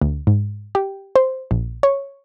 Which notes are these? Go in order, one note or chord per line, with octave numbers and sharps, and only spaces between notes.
D2
G#2
G4
C5
A#1
C#5